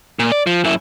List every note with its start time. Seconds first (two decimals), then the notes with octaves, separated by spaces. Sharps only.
0.19 A#2
0.32 D5
0.47 F3
0.64 F#2 E4